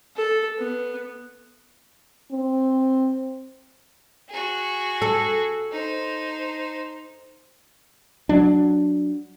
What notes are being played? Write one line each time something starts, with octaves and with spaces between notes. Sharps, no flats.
A4
B3
C4
F#4 G#4
A4
D#4 C5
F#3 D4